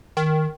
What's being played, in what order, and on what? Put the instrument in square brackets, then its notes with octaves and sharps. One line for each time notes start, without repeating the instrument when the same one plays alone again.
[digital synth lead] D#3